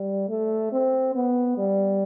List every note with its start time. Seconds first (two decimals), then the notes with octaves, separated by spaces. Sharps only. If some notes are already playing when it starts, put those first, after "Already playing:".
Already playing: G3
0.29 A3
0.72 C4
1.15 B3
1.58 G3